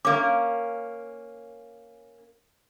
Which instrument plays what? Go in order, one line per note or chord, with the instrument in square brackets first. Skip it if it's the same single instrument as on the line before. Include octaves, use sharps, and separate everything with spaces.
[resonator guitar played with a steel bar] A#3 C#4 [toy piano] D6